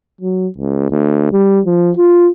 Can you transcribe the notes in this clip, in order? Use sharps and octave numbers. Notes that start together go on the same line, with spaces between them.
F#3
C#2
D2
G3
F3
F4